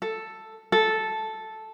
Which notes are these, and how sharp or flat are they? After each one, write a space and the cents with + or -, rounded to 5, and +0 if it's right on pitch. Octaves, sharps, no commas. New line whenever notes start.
A4 +5
A4 -5